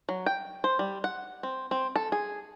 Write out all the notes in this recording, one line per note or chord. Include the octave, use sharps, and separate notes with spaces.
F#3
G5
C5
G3
F#5
C4
C4
A4
G#4